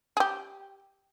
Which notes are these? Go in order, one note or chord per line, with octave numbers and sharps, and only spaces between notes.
G4 G#4